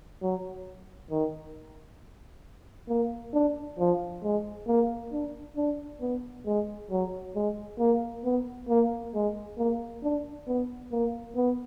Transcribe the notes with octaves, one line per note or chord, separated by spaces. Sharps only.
F#3
D#3
A#3
D4
F3
G#3
A#3
D4
D4
B3
G#3
F#3
G#3
A#3
B3
A#3
G#3
A#3
D4
B3
A#3
B3